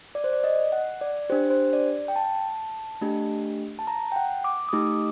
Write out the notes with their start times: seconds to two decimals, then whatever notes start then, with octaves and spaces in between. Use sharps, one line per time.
0.15 D5
0.24 C5
0.33 D5
0.44 D#5
0.72 F#5
1.01 D5
1.30 D4 G4 C5
1.50 C5
1.73 D5
2.08 G5
2.16 A5
3.01 A3 D4 G4
3.79 A5
3.87 A#5
4.12 G5
4.16 F#5
4.44 D6
4.69 D#6
4.73 A3 D#4 G4 D6